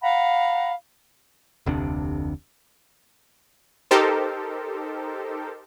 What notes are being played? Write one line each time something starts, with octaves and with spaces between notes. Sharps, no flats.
F5 F#5 A#5 B5
F1 D2 C3 D4
D#4 G4 A4 A#4 C5